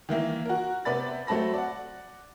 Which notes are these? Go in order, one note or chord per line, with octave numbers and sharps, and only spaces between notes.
D#3 E3 A#3 E4
F#4 A#4
C3 B3 D5 B5 A6
F#3 A3 C4 A5 B5 A#6
D5 F#5